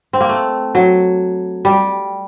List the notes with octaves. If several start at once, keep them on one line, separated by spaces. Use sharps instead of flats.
C4
A#3
A3
F#3
G3